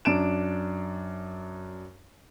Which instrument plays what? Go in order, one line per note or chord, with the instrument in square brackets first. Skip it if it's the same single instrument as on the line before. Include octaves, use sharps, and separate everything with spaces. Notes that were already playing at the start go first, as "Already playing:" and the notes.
[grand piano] F#2 D4 D7 E7